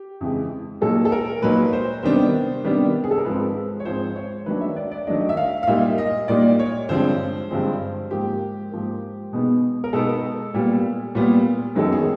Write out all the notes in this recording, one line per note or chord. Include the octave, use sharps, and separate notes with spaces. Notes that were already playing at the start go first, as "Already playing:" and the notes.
Already playing: G4
F2 C#3 E3 G#3
A#2 F#3 A#3 D#4 A4
A4
A#4
A#2 F#3 A#3 D#4 B4
C5
C3 D#3 G3 B3 D4 C5
C3 D#3 G3 B3 D4
G#4
A4
A#4
G#2 F3 G#3 C4 B4
C#5
G#2 F3 G#3 C4 C5
C#5
D#3 F#3 A3 D4 B4
E5
D5
D5
D#3 F#3 A3 D4 D#5
D#5
E5
F5
F5
A#2 G3 A#3 D#4 E5
D#5
A#2 G3 A#3 D#4 D5
C#5
G2 D3 F3 G#3 C4 C5
G2 D3 F3 G#3 C4
G#2 F3 A#3 G4
G#2 F3 A#3
B2 G#3 B3 D#4
A#4
B2 G#3 B3 D#4 A4
A#2 G3 B3
A#2 G3 B3
F#2 D#3 F#3 B3 D#4 A4
G#4